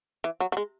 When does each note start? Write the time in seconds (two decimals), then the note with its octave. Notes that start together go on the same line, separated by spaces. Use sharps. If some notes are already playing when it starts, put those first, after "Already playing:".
0.24 E3
0.40 F#3
0.52 F#3
0.57 G#3